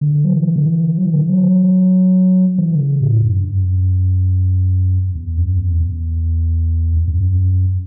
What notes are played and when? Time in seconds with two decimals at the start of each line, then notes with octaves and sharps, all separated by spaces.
0.01 D3
0.24 F#3
0.34 E3
0.56 D3
0.66 E3
0.98 F#3
1.06 E3
1.13 D3
1.21 E3
1.30 F#3
2.58 E3
2.75 D3
2.79 C#3
3.01 A2
3.22 F#2
3.36 G2
3.50 F#2
5.15 E2
5.37 F#2
5.58 E2
5.73 F#2
5.80 E2
6.96 E2
7.08 F#2